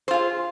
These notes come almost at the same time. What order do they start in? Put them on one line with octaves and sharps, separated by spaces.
C5 F4 G#4